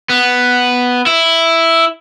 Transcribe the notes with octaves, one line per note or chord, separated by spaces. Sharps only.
B3
E4